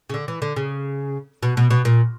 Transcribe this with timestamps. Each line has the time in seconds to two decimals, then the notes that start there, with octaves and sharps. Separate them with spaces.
0.10 C#3
0.14 D3
0.28 E3
0.42 D3
0.56 C#3
1.43 B2
1.57 B2
1.70 B2
1.85 A#2